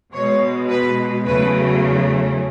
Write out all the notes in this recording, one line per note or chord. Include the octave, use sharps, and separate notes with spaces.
B2 G#3 C#5
B4
E2 C#3 F#3 A3 B4